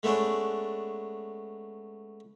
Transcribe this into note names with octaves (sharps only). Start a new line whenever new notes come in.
G#3 A3 B3 C#4 D4